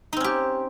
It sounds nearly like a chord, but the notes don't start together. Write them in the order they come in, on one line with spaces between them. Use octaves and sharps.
D#4 C4 C#4 G4